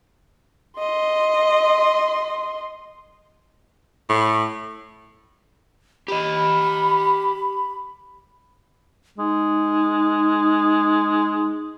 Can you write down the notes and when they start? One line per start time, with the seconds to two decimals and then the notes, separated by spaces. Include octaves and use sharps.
0.79 D#5 C6
4.09 A2
6.08 G4 D#5 B5
9.18 G#3 D#4